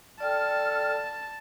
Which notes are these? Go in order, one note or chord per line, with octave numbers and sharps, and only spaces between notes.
A4 D5 G5 A5 F6